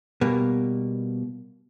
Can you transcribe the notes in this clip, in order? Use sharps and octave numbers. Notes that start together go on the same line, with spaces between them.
B2 G3 A#3